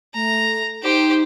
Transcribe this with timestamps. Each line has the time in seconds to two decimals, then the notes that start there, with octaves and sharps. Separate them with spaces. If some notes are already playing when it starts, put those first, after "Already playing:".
0.14 A3 A#5
0.83 D#4 G4 C5